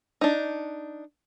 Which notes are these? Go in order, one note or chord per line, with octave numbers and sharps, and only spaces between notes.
D4 D#4